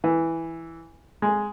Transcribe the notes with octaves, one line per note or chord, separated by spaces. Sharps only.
E3
G#3